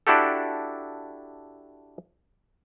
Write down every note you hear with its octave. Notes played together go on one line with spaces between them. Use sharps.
D4 E4 F#4 G4 A4